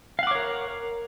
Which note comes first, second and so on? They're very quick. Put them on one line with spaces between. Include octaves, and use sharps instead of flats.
F5 F#5 D6 C#5 A#4